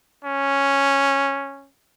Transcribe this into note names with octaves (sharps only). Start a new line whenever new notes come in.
C#4